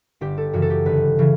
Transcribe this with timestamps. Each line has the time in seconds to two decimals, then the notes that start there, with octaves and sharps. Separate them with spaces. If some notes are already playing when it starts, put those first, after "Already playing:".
0.21 G1 G4
0.38 A4
0.53 F#2 C#3 E3 F#4
0.62 A4
0.70 G4
0.85 G1 B4
1.19 C#3 E3